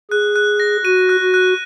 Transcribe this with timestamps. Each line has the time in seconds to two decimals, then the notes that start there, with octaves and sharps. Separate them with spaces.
0.11 G#4 F#6
0.36 F#6
0.60 A#6
0.85 F#4 D#7
1.09 F#6
1.21 F#4
1.34 F#6